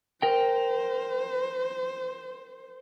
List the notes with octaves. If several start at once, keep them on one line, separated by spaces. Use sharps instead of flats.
A#4 C5 G5